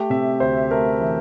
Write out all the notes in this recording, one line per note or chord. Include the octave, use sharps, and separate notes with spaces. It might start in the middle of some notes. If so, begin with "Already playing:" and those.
Already playing: A3 G4
C3 E5
D2 C5
A3 A#4
E3